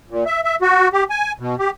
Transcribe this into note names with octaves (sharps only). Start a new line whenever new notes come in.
A#2
E5
E5
F#4
G4
G#5
B2
G4